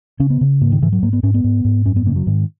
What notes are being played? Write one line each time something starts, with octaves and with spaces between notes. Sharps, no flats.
C#3 C#4
B3
C#3
G#2 A#3
D#3
G#2 E3
F#3
G#2 A#3
B3
G#2 C#4
B3
G#2
G#2
F#2 C#4
B3
C#3 A#3
F#3
G#2 D#3